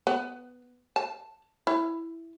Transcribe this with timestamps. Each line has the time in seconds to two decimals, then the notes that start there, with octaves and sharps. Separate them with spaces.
0.07 B3
0.96 A5
1.67 E4